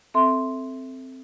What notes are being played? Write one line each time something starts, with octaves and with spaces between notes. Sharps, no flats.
C4 A4 E5 C6